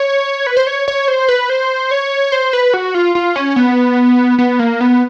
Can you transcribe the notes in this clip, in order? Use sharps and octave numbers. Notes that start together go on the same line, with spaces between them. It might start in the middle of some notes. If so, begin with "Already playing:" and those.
Already playing: C#5
B4
C5
C#5
C#5
C5
B4
C5
C#5
C5
B4
F#4
F4
F4
C#4
B3
B3
A#3
B3